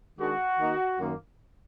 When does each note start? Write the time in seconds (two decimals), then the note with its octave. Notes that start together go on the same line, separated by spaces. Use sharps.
0.19 D#3 G#3 D4 F#4
0.59 D#3 A#3 D#4
0.99 F#2 D#3 A#3